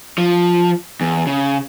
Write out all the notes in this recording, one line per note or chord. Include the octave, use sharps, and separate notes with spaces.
F3
E2
C#3